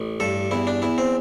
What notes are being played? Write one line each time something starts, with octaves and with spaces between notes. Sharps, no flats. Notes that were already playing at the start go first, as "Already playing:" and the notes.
Already playing: A1
G2 A4
E2 E4
D4
E2 E4
C4